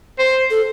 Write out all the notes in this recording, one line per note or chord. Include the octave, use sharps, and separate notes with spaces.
C5
A4